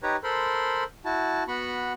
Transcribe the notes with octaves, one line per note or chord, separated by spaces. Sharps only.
D#4 G4 B4 C#5 A#5
A4 A#4 C5 B5 C6
E4 F#4 A5
B3 F#4 B5 C#6